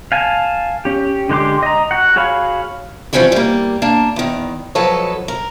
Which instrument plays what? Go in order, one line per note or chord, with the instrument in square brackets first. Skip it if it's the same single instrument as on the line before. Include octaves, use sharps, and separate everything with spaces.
[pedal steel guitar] F5 G#5 A5
C#4 G4
D3 G#3 G4 C6 D6
D#5 A#5
F#4 F#5
F#4 G#4 C#5 F5 B5
[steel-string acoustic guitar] E3 F3 G3 C4 C#4 F#4
G3 A#3
A#3 D4 A5
E2 D#3
F3 F#3 G#3 A4 B4 C#5
A#4